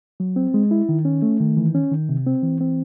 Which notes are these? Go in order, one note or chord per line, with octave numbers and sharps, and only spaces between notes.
F#3
C4
G#3
E4
D#3
C#4
A3
D#3
E3
C#4
D#3
C3
C4
E3
C4